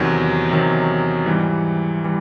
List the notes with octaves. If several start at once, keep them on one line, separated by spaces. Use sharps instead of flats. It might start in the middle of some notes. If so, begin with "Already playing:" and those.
Already playing: E2 C3 D#3 F#3
E2 C3 D#3 F#3
G#2 E3 G3
E3 G3